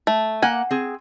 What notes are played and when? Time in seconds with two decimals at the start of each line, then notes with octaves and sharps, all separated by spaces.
0.07 A3
0.42 A#3 F#5 G#5
0.71 C4 G#4